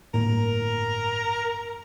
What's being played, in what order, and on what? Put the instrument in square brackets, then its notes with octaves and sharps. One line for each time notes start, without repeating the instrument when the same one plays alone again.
[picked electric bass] G1 A2 A#3 [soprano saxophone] A#4